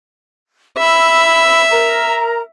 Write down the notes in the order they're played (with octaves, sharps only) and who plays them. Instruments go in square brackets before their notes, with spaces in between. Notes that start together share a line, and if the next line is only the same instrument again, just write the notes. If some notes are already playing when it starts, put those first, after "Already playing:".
[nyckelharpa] E5 [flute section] B5 E6
[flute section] A#4 A#5